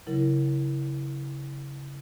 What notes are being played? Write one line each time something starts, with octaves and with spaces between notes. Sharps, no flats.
C#3 F#3 E4 A#4